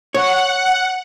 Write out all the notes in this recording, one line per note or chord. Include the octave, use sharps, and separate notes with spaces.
C#5 F#5